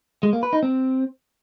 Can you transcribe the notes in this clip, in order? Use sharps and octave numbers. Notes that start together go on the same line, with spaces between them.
G#3
A#3
B4
D#4
C4